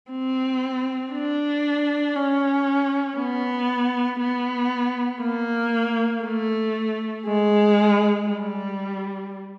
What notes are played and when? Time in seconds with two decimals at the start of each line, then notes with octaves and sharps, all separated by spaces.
0.12 C4
1.13 D4
2.16 C#4
3.18 B3
4.20 B3
5.22 A#3
6.24 A3
7.26 G#3
8.28 G3